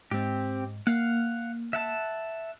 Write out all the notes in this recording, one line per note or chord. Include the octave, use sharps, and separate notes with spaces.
G#2 C4 G4
A#3 F5 F#5
E5 F#5 A5